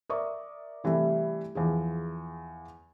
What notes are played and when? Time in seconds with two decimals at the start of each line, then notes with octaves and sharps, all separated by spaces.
0.09 A#4 D5 E5 C#6 D#6
0.84 C3 E3 G3 A3 E4
1.55 E2 F3 G#4